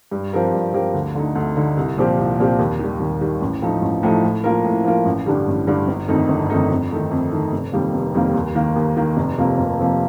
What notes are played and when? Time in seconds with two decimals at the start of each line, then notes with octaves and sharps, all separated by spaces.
0.11 G2
0.33 F3 C4 G4 A#4
0.53 G2
0.74 F3 C4 G4 A#4
0.94 D2
1.15 D3 A3 D#4
1.35 D2
1.56 D3 A3 D#4
1.77 C2
1.97 A#2 F3 C4 G4
2.18 C2
2.39 A#2 F3 C4 G4
2.59 D#2
2.79 D#3 G3
3.00 D#2
3.21 D#3 G3
3.41 A1
3.62 A2 F3 A3 D#4
3.82 A1
4.03 A2 F3 A3 D#4
4.24 A2
4.44 F3 A#3 F4 A#4
4.64 A2
4.85 F3 A#3 F4 A#4
5.05 A1
5.26 G2 D3 G3 D4
5.47 A1
5.67 G2 D3 G3 D4
5.88 G1
6.08 F2 D#3 A3 D#4
6.29 G1
6.50 F2 D#3 A3 D#4
6.70 F2
6.91 D#3 A3 D#4
7.11 F2
7.32 D#3 A3 D#4
7.53 F1
7.73 F2 D#3 G3 A#3
7.94 F1
8.14 F2 D#3 G3 A#3
8.34 D#2
8.55 D#3 A#3
8.76 D#2
8.97 D#3 A#3
9.17 F1
9.38 F2 C3 F3 A#3
9.58 F1
9.79 F2 C3 F3 A#3